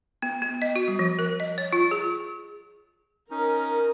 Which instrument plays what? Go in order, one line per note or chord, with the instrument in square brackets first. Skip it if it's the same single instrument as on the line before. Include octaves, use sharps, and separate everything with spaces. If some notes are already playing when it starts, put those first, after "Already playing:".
[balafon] B3
B3
D#5
F#4
G3
F3
A#4
D#5
C#5
F4
G#4
[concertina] C#4 D#4 [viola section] A#4